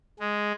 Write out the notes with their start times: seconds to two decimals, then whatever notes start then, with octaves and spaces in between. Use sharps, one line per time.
0.19 G#3